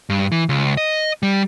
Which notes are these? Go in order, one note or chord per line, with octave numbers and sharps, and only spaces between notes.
G2
E3
C#2
D#5
G3